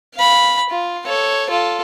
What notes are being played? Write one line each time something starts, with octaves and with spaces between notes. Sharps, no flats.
F5 B5
F4
A4 C#5
F4 A4